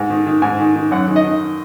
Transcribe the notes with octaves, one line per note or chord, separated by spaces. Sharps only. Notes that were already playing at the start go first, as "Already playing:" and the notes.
Already playing: G#2
D#3
D#3
G#2 G#5
D#3
D#3
F#2 F#5
D#3
D#5
D#3